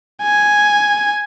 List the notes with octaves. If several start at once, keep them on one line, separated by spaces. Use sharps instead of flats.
G#5